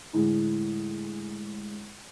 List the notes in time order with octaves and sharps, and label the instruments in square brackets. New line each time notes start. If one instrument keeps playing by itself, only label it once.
[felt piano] A2 D3 G#3